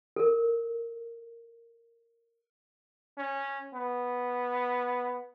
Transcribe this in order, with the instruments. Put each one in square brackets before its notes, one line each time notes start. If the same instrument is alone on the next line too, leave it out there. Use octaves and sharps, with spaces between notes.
[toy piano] A4 A#4
[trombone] C#4
B3